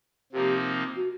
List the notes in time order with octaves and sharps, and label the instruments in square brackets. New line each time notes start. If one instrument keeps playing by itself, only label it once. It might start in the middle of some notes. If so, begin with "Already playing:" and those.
[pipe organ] C3 F3 A#3 D#4 [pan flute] G4
[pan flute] F#4